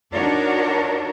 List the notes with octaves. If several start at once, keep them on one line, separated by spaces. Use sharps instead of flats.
D4 D#4 F#4 A#4 C#5 D5